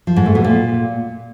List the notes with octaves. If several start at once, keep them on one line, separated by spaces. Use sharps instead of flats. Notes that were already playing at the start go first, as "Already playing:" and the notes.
F3
G#2
A3
B2
A#2